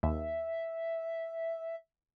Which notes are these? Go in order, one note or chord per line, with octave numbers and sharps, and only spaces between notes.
D#2 E5